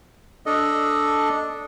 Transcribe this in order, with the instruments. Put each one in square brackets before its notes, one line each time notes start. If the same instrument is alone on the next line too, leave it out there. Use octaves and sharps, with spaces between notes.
[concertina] D4 A4 D#5